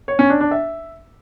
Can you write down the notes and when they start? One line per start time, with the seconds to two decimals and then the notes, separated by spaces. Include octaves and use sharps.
0.08 C#5
0.19 C#4
0.30 D4
0.40 D4
0.51 E5